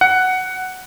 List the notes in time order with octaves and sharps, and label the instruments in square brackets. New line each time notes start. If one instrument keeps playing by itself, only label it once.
[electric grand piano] F#5